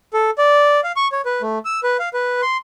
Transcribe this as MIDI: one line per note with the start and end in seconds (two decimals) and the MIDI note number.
0.14 0.30 69
0.38 0.80 74
0.84 0.92 77
0.96 1.08 85
1.12 1.21 73
1.25 1.42 71
1.42 1.58 57
1.65 1.80 88
1.83 1.97 71
1.99 2.09 77
2.14 2.41 71
2.42 2.57 84